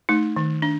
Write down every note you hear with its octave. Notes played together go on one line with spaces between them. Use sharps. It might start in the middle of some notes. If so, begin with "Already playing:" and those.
A3 D#4
D#3
D4